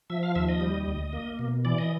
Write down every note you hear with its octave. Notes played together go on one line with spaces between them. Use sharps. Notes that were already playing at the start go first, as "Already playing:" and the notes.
F3 E5
F5
D#2 E5
D#5
G3
D2
A#3
B2
E3 D5
D#5